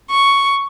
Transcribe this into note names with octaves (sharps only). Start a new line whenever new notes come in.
C#6